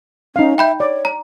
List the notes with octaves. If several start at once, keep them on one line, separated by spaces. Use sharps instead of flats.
C#4 D#4 F5
E5 G5 B5 G6
C#5 D5
A#5